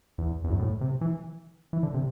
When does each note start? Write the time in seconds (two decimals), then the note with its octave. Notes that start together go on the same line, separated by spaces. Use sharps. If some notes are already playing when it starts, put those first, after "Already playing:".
0.18 E2
0.44 E2
0.50 F#2
0.59 A2
0.81 C3
1.01 E3
1.73 E3
1.83 D3
1.94 C3